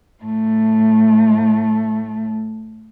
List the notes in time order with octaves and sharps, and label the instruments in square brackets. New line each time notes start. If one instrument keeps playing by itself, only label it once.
[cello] A2 A3